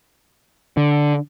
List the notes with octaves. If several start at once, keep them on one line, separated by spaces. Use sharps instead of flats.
D3